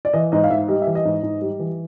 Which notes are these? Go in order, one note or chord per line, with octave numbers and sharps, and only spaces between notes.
D5
E3 D#5
G#2 D#5
F5
G#2 E5
G3 D#5
E5
E3
D#5
G#2
G#2
G3
E3